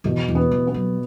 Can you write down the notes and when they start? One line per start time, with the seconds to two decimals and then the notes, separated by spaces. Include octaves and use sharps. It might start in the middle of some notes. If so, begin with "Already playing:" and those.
0.04 E2 B2
0.28 E2
0.35 B3
0.51 E3
0.67 B3
0.74 F#3